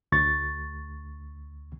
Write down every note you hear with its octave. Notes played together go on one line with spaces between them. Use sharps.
D2 C#6 A6